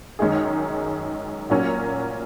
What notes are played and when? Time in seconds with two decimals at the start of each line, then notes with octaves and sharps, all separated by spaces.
0.19 F#2 D#3 G#3 D#4 G#4
1.50 A#2 F#3 A#3 C#4